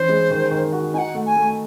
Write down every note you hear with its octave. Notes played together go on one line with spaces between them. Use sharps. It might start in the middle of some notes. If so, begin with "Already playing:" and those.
Already playing: E3 C#4 C5
G#3
D#3
D#3
F#4
D#4 F#5 G#5
A3
G#5
A3